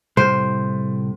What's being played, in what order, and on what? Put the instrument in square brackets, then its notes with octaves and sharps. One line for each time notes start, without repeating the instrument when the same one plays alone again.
[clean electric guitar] C2 A2 [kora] C5